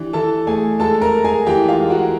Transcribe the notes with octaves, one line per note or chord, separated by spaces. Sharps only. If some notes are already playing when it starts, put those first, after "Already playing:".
Already playing: E3 D4 G4
E3 A4 A5
A3 G#4 G#5
G#3 A4 A5
A#4 A#5
G#3
G#4 G#5
E3 G4 G5
F4 F5
G#3
F#4 F#5